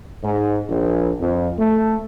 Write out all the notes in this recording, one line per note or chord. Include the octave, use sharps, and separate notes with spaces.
G#2
A#1
F2
A3